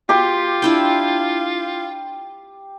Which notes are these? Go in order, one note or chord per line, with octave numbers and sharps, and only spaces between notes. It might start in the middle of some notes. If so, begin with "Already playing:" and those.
F4 G4 C6
D4 E4 G5